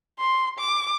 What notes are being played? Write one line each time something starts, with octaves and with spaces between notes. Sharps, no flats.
C6
D6